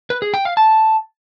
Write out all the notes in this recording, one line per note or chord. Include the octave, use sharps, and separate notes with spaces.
B4
G#4
G5
F5
A5